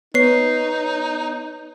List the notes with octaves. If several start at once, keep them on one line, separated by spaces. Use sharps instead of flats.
B3 D#4 B4 C#5 C7